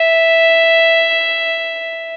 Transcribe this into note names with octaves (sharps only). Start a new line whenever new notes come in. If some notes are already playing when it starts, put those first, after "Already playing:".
Already playing: E5